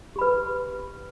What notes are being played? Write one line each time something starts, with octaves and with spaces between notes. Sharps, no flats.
G4 B4 B5